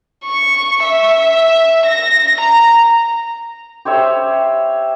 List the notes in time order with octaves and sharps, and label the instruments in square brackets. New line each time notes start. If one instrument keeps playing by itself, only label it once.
[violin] C#6
E5
A#6
A#5
[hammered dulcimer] G4 C5 C#5 E5